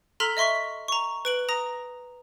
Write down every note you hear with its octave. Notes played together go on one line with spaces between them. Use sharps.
A4 A#5 C6 F6 B6
D#5 E5 C6 C#6 B6
A#5 C#6
B4 D7 F#7
A#5 D#6 A#6